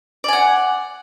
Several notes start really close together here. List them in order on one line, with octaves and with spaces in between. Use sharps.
D5 G#5 F#5